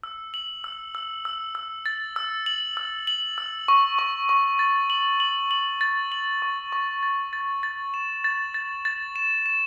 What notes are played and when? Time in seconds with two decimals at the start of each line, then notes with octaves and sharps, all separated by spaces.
0.03 E6
0.34 F#7
0.64 E6
0.95 E6
1.25 E6
1.55 E6
1.86 A6
2.16 E6
2.46 F#7
2.77 E6
3.07 F#7
3.38 E6
3.68 C#6
3.99 C#6
4.29 C#6
4.59 A6
4.90 F#7
5.20 F#7
5.51 F#7
5.81 A6
6.12 F#7
6.42 C#6
6.72 C#6
7.03 A6
7.33 A6
7.63 A6
7.94 E7
8.24 A6
8.54 A6
8.85 A6
9.16 E7
9.46 E7